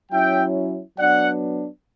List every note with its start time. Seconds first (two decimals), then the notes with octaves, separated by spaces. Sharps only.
0.12 F#3 C#4 E4 E5 G5
0.98 F#3 B3 D4 D5 F#5